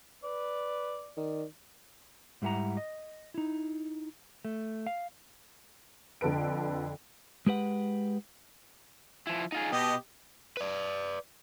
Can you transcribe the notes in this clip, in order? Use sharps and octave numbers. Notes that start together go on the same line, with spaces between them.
B4 D5
D#3 D5
G#2 G3 E4 G#4 F#5 A#5
D#5
D#4 E4
A3
F5
F2 D3 A4 B4 D7
G#3 G4 B4 F#5
F3 E4
D#4 F4 G#4
B2 G4 D#5
B4 D5